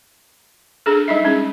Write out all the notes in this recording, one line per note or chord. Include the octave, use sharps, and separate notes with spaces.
D4 G#4 A4
G3 D#4 E5
G#3 C#4 D#4 G#4